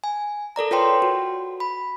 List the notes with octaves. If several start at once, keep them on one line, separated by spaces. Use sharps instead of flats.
G#5
A4 A#4 D5 A#5
F4 B4 C#5 G5 C6
F#4
B5